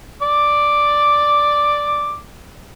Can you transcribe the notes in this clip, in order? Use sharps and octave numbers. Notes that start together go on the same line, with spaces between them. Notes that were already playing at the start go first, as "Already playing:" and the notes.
D5 D6